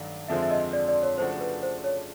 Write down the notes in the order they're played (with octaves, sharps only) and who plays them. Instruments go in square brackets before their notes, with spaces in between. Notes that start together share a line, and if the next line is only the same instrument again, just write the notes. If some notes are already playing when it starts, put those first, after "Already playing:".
Already playing: [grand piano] G2 D#3 F#3 A3 D4
[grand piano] F2 D3 F3 G#3 C4 [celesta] E5
[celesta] E5
D#5
D5
D5
C#5
[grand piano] C#3 F3 A3 D4 F#4 [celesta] C5
[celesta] B4
C5
C#5